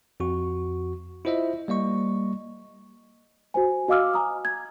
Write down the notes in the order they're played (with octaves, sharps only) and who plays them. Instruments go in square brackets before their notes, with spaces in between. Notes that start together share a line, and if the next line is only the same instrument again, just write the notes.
[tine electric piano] F2 F#4 C#6
E4 F4 C5 D#5 E5
G3 A#3 D#5 C#6
[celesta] F#4 C5 G#5
F#4 D#5 F5 D6 E6 F6
G#5 A#5 D#6
G#6